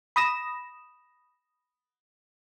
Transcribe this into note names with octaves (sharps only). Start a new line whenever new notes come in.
B5 D#6 A#6 E7